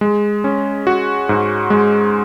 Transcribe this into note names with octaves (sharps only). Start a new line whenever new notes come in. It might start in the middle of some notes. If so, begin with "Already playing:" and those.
G#3
C#4
F#4
G#2
G#3